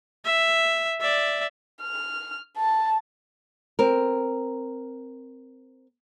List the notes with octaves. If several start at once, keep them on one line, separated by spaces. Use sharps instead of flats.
E5
D5 E5
F6
A5
C4 A#4